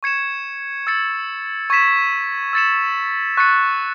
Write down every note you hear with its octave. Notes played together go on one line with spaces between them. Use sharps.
C#6 G#6 C#7 E7
E6 A6 C#7
C#6 G#6 B6 E7
E6 A6 C#7 E7
C#6 F#6 A6 C#7